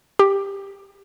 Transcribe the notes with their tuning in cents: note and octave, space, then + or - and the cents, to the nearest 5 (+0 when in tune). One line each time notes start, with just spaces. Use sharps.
G4 +15